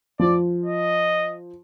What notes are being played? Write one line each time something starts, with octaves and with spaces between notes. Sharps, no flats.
F3 D5
D#5